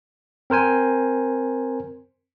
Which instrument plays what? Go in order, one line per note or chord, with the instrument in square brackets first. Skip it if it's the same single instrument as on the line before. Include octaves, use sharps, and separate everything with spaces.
[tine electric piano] C4 A#4 C5 G#5